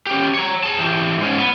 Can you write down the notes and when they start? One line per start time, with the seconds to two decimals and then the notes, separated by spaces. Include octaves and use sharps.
0.07 C#4 G4
0.34 C#5 A#5
0.63 G#4 A5
0.79 E3 G4
1.19 G#2 C#4
1.39 B3